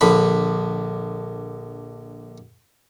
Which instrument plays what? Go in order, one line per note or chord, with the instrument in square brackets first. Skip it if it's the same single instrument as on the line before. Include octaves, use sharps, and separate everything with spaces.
[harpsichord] A#1 D3 B5